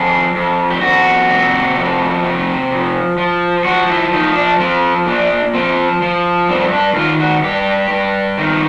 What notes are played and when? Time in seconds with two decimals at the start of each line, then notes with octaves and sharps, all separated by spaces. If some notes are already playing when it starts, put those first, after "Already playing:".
Already playing: F2 G#4
0.35 F2
0.70 G4
0.81 F2 F#4
1.29 C3
1.76 F2
2.23 C3
2.71 F3
3.18 F3
3.65 F3 F#4
3.90 E4
4.13 F3 D#4
4.36 D4
4.60 F3 C4
5.06 A#2 D4
5.54 F3 C4
6.02 F3
6.49 G2 C4
6.72 D4
6.96 D#3 F4
7.20 F#4
7.43 G2 G4
7.91 G2
8.38 D#3